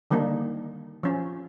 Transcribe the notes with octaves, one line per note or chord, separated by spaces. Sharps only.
D3 D#3 G3 A#3 D#4
F3 C#4